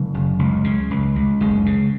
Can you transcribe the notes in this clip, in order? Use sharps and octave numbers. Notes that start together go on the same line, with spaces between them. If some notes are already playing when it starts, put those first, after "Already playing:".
Already playing: C#3 F#3
F#1
C#2
C#3
C#2
C#2
F#1 G#3
C#3